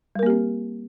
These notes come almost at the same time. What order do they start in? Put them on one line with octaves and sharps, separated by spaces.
G3 A#4 A#3 G4 C4